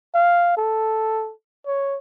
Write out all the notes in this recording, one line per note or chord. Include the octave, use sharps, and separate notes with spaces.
F5
A4
C#5